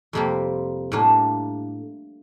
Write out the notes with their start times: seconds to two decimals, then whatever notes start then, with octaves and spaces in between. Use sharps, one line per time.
0.13 F2 C3 G3 A#3
0.92 A2 G3 A#3 D4